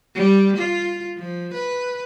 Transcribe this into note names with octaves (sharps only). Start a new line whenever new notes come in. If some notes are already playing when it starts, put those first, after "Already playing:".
G3
F4
F3
B4